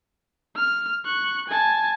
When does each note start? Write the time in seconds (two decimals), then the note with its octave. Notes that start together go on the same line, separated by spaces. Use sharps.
0.56 F6
1.05 C#6 F#6
1.48 G#5 A5